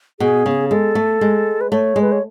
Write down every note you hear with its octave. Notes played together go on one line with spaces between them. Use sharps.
B2 G#4
C#3
G#3 A4
A3
G#3
B4
A3 C#5
G#3
B4
C#5